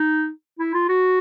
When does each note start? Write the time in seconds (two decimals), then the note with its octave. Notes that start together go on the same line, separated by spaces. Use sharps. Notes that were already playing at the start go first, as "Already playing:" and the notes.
Already playing: D#4
0.59 E4
0.74 F4
0.89 F#4